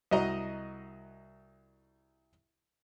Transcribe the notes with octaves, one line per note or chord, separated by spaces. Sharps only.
C2 F#4 D#5 A#5